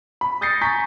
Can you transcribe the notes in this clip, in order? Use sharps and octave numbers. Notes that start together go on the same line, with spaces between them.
B5
D#6 G6 A6 A#6 C7 C#7
G#5 A#5 C#6 G6 A6 B6